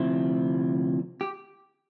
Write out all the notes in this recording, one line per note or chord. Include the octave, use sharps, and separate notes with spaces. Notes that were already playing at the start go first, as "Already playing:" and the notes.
Already playing: D2 C3 F3 C4 E4
G4